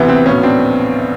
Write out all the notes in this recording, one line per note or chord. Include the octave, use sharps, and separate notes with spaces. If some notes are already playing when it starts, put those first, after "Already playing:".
Already playing: D2 C3 E3 B3
C4
A#1 A2 F#3 B3 C#4
C4 D4